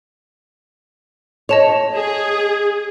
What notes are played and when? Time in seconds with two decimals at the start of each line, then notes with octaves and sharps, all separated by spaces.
1.49 C#5 D#5 A5 F7
1.96 G#4